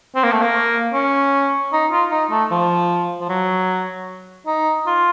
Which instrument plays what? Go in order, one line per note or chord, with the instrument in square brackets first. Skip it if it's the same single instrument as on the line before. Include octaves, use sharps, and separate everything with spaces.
[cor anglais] C4
A#3
A3
A#3
C#4
D#4
F4
D#4
A3
F3
F3
F#3
D#4
F4